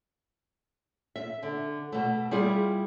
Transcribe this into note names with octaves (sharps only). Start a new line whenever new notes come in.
E5
D3
B2 A3
G3 E4 F4 G#4